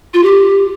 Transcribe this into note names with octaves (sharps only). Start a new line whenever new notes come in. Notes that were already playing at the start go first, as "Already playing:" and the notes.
F4
G4